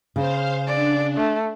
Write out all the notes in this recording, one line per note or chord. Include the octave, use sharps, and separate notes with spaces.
C#3 C5 F5
D4 D5
A3